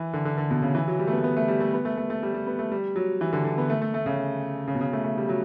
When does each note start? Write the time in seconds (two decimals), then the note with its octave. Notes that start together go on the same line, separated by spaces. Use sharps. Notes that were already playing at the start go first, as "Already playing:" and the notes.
Already playing: E3
0.13 D3
0.25 D3
0.38 D3
0.51 B2
0.62 C#3
0.75 E3
0.88 F#3
0.99 G3
1.07 A3
1.12 B3
1.19 A3
1.24 B3
1.37 A3
1.48 G3
1.60 A3
1.73 B3
1.85 A3
1.97 A3
2.10 A3
2.23 G3
2.34 G3
2.47 B3
2.59 A3
2.71 G3
2.96 F#3
3.21 E3
3.33 D3
3.44 D3
3.58 B3
3.70 A3
3.81 A3
3.94 A3
4.06 C#3
4.67 C#3
4.75 B2
4.81 C#3
4.93 A3
5.04 A3
5.18 G3
5.29 F#3